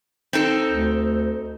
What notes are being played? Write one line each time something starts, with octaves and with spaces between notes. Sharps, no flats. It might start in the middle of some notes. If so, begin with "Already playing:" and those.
C4 D#4 A4
D2